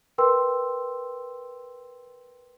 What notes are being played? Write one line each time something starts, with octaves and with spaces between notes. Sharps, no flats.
A#4 B4 G5 C6 E6